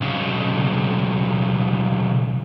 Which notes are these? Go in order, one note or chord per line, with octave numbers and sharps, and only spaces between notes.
B1 C#3